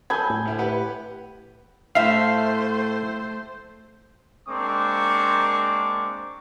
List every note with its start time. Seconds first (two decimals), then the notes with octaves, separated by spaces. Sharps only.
0.10 F#3 A4 G#5 B5 G6 G#6
0.30 A2
0.45 D2 E4
0.59 G4 B4 F#5
1.95 A2 A3 C5 E5 F5
4.47 G#3 A#3 C4 D4 C#6 D6